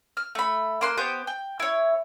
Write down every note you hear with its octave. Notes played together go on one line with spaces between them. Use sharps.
F6
A3 B5
A#3 C6 F#6
B3 G4 C5 G6
G5
E4 C#5